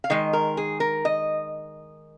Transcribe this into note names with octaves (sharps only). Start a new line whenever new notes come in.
F5
D#3 G#3 D#5
A#4
G#4
A#4
D#5